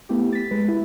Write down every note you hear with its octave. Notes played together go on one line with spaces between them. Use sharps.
A3 B3 E4 G4
A6 B6
G#3 B4
E4